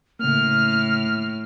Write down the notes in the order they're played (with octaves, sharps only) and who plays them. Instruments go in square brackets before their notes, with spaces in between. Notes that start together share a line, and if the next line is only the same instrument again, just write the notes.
[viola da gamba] A2 [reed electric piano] C#3 A#3 [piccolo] F6